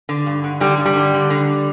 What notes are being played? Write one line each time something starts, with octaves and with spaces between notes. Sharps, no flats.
D3
G2
D3
D3 G3
G2
G3
D3
D3
D3